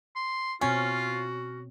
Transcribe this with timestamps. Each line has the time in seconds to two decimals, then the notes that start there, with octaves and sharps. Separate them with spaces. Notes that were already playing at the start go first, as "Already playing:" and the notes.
0.16 C6
0.61 B2 C4 C#4 F4 F#4 C#5